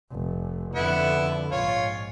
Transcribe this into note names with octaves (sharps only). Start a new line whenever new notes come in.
F1
F2 D3 B3 E4
A#1 G#2 F4 C#5